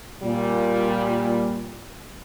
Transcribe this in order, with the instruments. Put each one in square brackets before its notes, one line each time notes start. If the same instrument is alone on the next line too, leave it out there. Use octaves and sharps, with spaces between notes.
[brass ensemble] A#2 G3